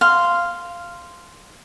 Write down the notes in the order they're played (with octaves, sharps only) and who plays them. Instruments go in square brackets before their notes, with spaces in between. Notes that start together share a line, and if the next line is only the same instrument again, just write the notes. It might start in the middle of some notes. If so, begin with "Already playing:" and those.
[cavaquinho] F5 C6